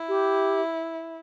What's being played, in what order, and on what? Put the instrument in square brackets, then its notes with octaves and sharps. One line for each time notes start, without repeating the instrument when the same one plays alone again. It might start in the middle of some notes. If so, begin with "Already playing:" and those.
Already playing: [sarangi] E4
[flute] G4